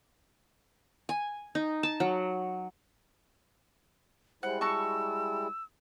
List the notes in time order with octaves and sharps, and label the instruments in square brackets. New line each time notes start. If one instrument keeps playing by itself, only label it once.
[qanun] G#5
D#4
A5
F#3
[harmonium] G3 G#3 E4 [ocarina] C5 [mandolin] F#5
[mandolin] F#4 A5 C#6 [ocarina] E6